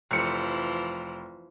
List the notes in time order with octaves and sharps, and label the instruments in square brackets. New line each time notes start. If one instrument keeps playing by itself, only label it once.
[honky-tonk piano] F1 C#7 [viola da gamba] E3 F3